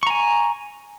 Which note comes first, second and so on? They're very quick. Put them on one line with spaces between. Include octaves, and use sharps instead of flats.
C#6 A#5 G#5